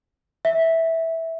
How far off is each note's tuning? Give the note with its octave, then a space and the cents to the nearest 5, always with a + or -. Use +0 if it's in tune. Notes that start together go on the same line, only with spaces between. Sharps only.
E5 -10